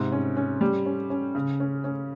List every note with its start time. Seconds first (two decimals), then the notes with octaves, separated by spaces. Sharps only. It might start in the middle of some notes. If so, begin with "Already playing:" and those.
Already playing: G#2 C3
0.12 C#4
0.37 C#4
0.61 G3
0.86 C#4
1.10 C#4
1.35 C#3
1.60 C#4
1.84 C#4